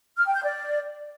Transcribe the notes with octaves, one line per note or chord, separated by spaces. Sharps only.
F6
G5
G6
D5